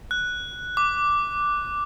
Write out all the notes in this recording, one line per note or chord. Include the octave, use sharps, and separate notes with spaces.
F#6
D6